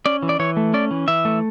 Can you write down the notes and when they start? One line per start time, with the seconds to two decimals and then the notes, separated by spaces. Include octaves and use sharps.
0.06 C#4 D5
0.23 E3
0.29 D5
0.39 E3 C#5
0.57 A3
0.74 C#4 D5
0.91 E3
1.08 E3 E5
1.25 A3